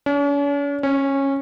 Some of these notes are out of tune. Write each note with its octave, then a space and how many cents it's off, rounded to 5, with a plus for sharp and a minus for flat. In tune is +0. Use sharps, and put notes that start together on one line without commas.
C#4 +45
C#4 -15